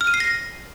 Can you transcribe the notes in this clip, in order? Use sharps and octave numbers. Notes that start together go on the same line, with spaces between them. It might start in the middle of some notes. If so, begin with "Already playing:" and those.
F6
D#7
C7
A#6